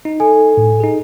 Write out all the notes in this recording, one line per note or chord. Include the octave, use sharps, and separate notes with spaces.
D#4
A4 G#5
A2
D#4 G#4